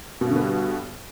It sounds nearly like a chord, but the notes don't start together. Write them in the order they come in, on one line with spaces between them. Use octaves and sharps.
B2 G2 D3 B3 G3